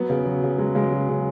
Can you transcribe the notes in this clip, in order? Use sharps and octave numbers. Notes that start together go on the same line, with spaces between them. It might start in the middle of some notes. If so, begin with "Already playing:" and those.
Already playing: F#3 B3
C#3
F#3
C#3
F#3 G#3
C#3 G#3
F#3
C#3